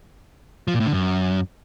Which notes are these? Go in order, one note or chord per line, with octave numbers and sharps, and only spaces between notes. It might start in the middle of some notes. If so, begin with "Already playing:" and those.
F3
A#2
A2
D3
F#2